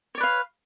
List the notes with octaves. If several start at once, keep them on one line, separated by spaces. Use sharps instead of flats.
B4 C#5 D5 F5